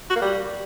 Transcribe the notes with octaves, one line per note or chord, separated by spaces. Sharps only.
F#4
A#3
G3